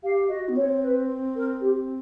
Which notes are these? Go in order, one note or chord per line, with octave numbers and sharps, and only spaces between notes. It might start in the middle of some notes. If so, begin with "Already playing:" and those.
G4 F5
F#4 D#5
B3
C4 C#5
B4
A#4
G4